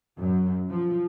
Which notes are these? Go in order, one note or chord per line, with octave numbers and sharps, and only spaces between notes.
F#2
F3